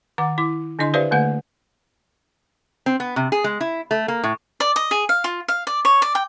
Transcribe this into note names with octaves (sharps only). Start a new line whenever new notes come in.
D#3 F#5 D6
E4 D6
D3 D4 E4 D#5 C6
G4 B4 C5 D5 E5 F5
D3 A3 A#3 B4 F#5
C4
B3
C3
G#4
G#3
E4
A3
A#3
A2
D5
D#5
G#4
F5
F4
F5
D5
C#5
D5
G5